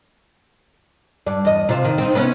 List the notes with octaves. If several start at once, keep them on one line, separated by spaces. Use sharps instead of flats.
G2 D5
E2 D#5
C3 F4 C5
D#3
C4 D#4
C3 B3 C#4